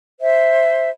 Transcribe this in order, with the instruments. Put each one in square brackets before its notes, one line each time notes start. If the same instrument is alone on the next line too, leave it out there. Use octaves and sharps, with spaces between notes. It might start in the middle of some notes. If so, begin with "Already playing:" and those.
[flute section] C5 E5